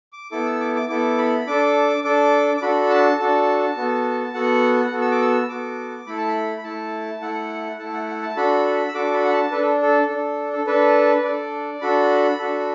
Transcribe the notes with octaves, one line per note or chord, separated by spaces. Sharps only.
D6
B3 E4 A4 D6
E6
D6
D6
B3 E4 A4 D6
B5
D4 A4 D6
D4 A4 D6
D6
D4 F#4 A4 B5
A5
D4 F#4 A4
B3 F#4 A4
B3 F#4 A4 F#5
B3 F#4 A4
E6
D6
E6
B3 F#4 A4 D6
A3 E4 A4 B5
A5
B5
B5
A3 E4 A4 A5
A3 E4 A4 F#5
A3 E4 A4 A5
F#5
F#5
A5
D4 F#4 A4 B5
E6
D4 F#4 A4 D6
B5
F#5
A5
D4 A4 B4
A4
A4
D4 A4
A4
D4 A4 B4
D4 A4 D5
D4 F#4 A4 B5
D4 F#4 A4